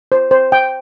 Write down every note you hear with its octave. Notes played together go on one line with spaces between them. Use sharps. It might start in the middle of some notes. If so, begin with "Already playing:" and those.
C5
C5
G5